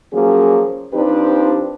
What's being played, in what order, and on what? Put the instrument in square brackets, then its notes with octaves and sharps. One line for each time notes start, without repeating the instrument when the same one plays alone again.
[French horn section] F3 F#3 A#3 C#4 G#4
F3 C4 D4 D#4 G4 B4